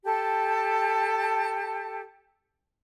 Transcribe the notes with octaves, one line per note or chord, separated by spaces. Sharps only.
G4 A4 A5